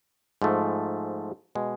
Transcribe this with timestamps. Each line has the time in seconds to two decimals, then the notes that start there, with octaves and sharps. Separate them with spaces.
0.42 G#2 F3 A3
1.55 B2 G#3